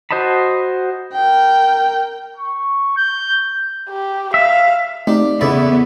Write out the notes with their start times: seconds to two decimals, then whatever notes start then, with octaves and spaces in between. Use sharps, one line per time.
0.11 F#4 C5 D#5 A5 B5
1.13 A#4 G5
2.37 C#6
2.97 G6
3.89 G4
4.34 E5 F5
5.07 A3 C4 D4 D#4 G4
5.41 E2 C#3 A3 B3 E4 D5 D#5 B5